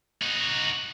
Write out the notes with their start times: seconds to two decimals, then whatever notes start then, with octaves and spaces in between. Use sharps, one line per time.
0.22 D#4 F#4